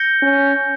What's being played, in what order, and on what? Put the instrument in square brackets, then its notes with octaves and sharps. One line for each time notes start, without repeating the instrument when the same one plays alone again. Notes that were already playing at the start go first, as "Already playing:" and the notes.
Already playing: [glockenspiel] G6 A#6 C#7 G7
[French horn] C#4